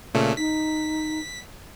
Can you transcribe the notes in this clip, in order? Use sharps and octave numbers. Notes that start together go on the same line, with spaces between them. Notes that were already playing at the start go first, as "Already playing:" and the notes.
A#2 C#3 A3
D#4 B6